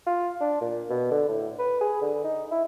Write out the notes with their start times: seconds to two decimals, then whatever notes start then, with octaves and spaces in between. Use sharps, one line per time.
0.07 F4
0.41 D4
0.61 A#2
0.90 B2
1.11 D3
1.29 A2
1.59 B4
1.81 G#4
2.02 D3
2.24 D#4
2.51 E4